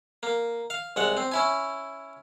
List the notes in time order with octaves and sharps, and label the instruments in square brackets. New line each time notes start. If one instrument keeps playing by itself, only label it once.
[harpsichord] A#3
F5
C2 G#3 F#5
C4
C#4 E4 G#5